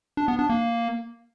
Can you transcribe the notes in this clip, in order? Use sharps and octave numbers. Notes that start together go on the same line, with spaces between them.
D4
B3
D4
A#3